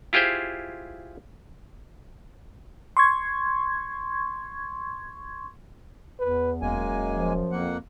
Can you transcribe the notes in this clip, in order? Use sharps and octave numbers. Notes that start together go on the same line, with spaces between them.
E4 F4 G4 G#4 C5
C6 C#6 G#6
E2 B4
E1 F#2 G#3 A#3 G#5
F3
F2 A#3 F#5